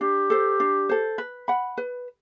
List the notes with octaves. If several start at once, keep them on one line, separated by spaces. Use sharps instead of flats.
D4 G4
A4 C5
D4
A4 C5
B4
F#5 B5
B4